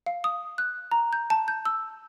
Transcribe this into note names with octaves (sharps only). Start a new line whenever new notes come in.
F5
D#6
F#6
A#5
G6
A5
G6
E6